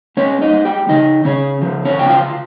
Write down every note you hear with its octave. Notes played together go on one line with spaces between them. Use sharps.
G#3 C#4 C#5
D#4 D#5
G#3
G4 G5
C#3 D#4 D#5
C#3 C#4 C#5
F3
C#4 C#5
C#3 G5
F4 F5